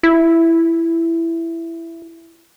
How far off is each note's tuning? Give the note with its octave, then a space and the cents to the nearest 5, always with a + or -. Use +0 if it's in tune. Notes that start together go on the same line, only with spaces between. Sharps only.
E4 +10